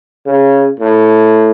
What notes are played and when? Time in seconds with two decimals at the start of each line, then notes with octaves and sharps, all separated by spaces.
0.26 C#3
0.80 A2